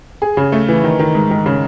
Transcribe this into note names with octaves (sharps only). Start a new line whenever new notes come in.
G#4
C#3
A3
E3
D#3
D#3
G#2
D#3
C#3